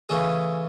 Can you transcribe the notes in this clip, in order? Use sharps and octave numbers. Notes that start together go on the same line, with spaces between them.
C#3 E3 A3 G#4